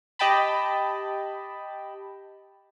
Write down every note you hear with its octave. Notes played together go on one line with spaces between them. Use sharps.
G4 D#5 G5 A5 B5